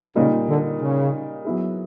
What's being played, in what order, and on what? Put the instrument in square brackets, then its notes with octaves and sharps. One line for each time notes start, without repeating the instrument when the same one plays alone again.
[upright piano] A#2 G3 A#3 D#4 [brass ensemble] C#3
[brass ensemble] D3
C#3
[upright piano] F#3 B3 E4 G#4